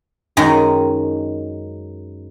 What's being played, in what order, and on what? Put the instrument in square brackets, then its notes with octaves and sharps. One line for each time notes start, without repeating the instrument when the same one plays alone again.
[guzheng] F#2 D#3 G#3 A#5